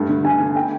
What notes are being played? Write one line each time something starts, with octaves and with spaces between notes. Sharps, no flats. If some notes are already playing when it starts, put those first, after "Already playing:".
Already playing: G2 A3
D3
D3 G#5
D3
A3 G5